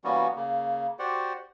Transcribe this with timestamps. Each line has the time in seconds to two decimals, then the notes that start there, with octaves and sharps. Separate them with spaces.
0.04 E3 G3 A#3 B3 C#4 F#4
0.36 C#3 A#3
0.99 F#4 G4 C5 D5 F#5